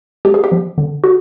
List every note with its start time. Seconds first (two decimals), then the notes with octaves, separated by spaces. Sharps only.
0.25 G#3 G4
0.34 G#4
0.44 G4
0.52 F3
0.78 D3
1.04 F#4